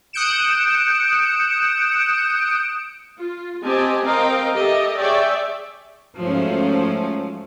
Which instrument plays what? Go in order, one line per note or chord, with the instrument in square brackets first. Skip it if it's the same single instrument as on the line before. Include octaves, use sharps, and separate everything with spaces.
[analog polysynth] D#6 F#6 G6 C#7 D7 E7
[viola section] F4
C4 G4 D#5 G#5 A5
C4 A#4 D#5 F5 G5
G4 A4 D#5 E5
G#4 C#5 D5 E5 G5
[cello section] G#2 F3 F#3 A3 C#4